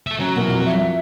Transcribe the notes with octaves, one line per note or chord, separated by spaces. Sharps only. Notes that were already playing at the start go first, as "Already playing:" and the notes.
A4 E5
F#3 C#4 A#5
B2 E3 A#4
F2
E5